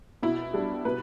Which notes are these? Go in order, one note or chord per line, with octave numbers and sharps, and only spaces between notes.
B2 E4
G3 D4
B2 B4